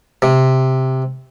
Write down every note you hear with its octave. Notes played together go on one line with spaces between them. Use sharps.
C3